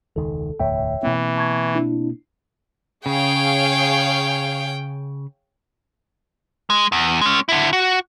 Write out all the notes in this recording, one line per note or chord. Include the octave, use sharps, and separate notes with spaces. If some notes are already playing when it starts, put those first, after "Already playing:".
E1 C#2 D#3 A4
E1 D2 A2 C#5 E5 G5
B2 E3 A#3 C4
A5 C#6 G#6
D4 E4
C#3 G#4 C#5 F5 G5
G#3
E2
G#3 C#4
D3 E4
F#4